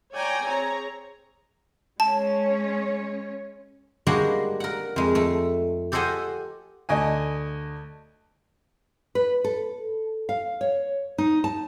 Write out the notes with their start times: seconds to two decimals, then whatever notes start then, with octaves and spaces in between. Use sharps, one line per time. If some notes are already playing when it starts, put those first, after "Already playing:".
0.13 C#5 D5 G5 G#5 A#5
0.45 C4 G#4 C#5 A#5
2.00 G#3 C#4 C#5 A5
4.07 G3 G#3 A#3 D4 F#4 G#4
4.60 A#4 F#5
4.96 F2 G#3
5.15 A3
5.92 G4 A4 C5 D#5 F#5 G#5
6.89 D2 D#5 G#5
9.15 B4
9.45 A4
10.29 F5
10.61 C#5
11.18 D#4
11.44 A5